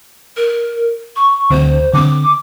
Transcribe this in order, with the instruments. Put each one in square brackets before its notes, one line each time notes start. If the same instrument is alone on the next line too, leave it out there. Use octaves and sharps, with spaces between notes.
[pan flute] A#4
C#6
[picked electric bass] D2 D3 C4 [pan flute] C5
[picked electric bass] D3 C4 [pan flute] D6